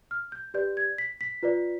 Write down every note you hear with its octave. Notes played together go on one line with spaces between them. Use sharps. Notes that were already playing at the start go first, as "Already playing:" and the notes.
F6
G6
G4 B4 D5 G6
G#6
B6
B6
F4 B4 D5